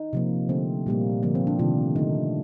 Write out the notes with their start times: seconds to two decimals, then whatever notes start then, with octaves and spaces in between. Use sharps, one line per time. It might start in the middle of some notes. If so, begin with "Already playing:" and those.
Already playing: D#4
0.13 C3 F3 A#3
0.49 D3 A3 C4
0.86 A#2 G3 A#3
1.23 D3 F3 A#3
1.35 C4
1.47 D4
1.59 C3 D#3 A3 F4
1.96 D3 A3 D#4